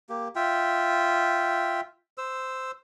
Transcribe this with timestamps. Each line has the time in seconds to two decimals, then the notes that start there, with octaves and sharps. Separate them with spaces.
0.09 A#3 G4
0.36 F4 E5 G5
2.18 C5 E6